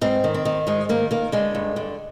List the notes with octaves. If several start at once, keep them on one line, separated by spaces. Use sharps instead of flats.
G#2 C4
D#3
C4
D#3
G#2 G#3
D#3 A#3
D#3 A#3
D3 G#3
G2
D3